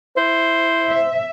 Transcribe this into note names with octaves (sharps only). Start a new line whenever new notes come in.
E4 C5
E5